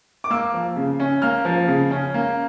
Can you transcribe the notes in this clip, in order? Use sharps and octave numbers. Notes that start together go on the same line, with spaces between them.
D6
A#3 E6
F3
C#3
C#4
A#3 F6
F3
C#3
C#4
A#3